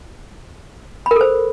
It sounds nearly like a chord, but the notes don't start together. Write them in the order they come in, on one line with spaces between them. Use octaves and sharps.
B5 A#4 A4 C5